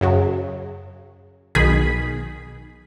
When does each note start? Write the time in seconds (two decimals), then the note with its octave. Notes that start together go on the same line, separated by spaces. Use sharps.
0.01 F#2 C#3 F#3
1.55 B1 D#3 G#4 B5